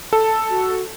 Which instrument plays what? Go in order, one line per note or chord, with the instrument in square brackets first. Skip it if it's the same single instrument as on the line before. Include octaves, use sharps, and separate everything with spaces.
[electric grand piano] A4 [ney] A5
[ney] F#4